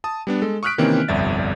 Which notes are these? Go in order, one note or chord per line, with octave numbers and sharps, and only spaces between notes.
A5 D#6
G3 B3 D4
G#3 A4
C#6 D#6 F6 F#6 B6 D7
C3 D#3 E3 A#3 C4 C#4
G1 C2 F2 D5 E5 A6